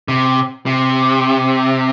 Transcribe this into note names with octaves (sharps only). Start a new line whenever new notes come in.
C3
C3